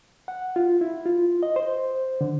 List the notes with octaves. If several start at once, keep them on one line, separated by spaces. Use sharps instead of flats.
F#5
F4
E4
F4
D#5
C5
D3